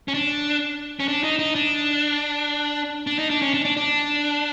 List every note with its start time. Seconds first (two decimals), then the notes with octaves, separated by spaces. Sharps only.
0.08 C#4
0.14 D4
1.00 C#4
1.08 D4
1.23 D#4
1.39 D#4
1.55 D4
3.07 D4
3.19 D#4
3.30 D4
3.42 C#4
3.54 D4
3.65 D4
3.77 D4